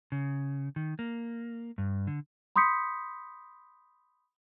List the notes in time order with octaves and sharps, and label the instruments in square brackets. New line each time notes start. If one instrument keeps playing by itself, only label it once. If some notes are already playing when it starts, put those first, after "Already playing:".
[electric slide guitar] C#3
D#3
A#3
G2
D3
[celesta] B5 C6 D#6 G6 B6 C#7